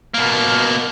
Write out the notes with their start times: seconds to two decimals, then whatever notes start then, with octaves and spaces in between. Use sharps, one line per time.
0.14 B2 A#3